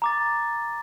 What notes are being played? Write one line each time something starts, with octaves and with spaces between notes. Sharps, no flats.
A#5 D6 A6